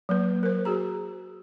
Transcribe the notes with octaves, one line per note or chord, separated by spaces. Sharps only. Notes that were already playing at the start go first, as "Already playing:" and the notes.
F#3 A#3 B4
A#4 C5
F#4 G#4 A#5